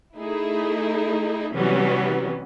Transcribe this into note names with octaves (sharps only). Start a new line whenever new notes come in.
A3 D#4 E4 G#4
C3 E3 F#3 G3 B3 C#4